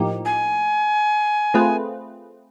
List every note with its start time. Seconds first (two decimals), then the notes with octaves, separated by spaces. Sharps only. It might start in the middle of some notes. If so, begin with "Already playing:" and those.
Already playing: A2 F3 A#3 D#4 G4
0.25 G#5
1.54 A3 C4 F4 G#4 B4